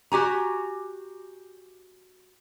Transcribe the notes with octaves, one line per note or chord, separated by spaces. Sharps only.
F#4 G4 G#5 A#5